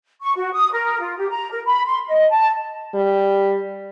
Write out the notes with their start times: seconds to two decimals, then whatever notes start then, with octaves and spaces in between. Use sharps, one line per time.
0.22 C#6
0.35 F#4
0.52 D#6
0.72 A#4
1.00 F4
1.18 G4
1.29 A#5
1.51 A#4
1.65 B5
1.86 C6
2.08 D#5
2.31 A5
2.94 G3